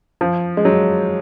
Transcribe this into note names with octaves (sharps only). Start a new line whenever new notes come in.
F3
G#3
F#3